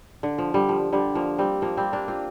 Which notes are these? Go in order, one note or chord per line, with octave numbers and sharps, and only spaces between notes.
D3
F3
D3 G3
F3
D3 G3
F3 A#3
G3 C4
F3 A#3
G3 C4
A#3 D4
C4 F4